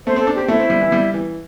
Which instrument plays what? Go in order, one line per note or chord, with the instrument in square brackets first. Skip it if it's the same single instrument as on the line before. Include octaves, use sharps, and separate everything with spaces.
[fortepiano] A3 [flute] C5
[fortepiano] C4 [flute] A4
[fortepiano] D4
[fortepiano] C4 [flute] G4
[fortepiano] A3 [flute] E4
[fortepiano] C4
G3
E3
G3
E3